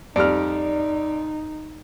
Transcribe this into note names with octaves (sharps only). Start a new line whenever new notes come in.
F2 G3 D#4 D5 F6